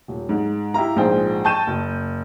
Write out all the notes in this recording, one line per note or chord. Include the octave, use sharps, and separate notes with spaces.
D#1
G#2
E4 G4 F5 A#5
A#1 G#2 F3 G#4 C5 G5
G5 A5 C#6 G6 D#7 E7
F#1